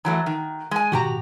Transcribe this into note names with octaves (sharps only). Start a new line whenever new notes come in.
E3 F#3 A3 A#5 F#6
D#3
G#3 G#5
G#2 B2 D#3 F#4 G4 A#5